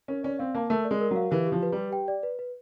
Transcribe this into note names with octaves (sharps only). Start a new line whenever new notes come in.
C#4 A#4
C#4 D5
C4 F5
A#3 A5
A3 A#4
D5
G#3
A#4
F#3
F5
E3 G4
G4
F3
B4
G3 G4
G5
D5
B4
B4